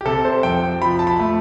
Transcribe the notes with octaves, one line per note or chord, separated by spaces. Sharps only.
G4
C3 A4
C5
F2 G5
G5
F3 B5
A5
B5
A3